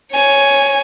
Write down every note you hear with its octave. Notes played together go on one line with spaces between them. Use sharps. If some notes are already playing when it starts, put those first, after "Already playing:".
C#5 G#5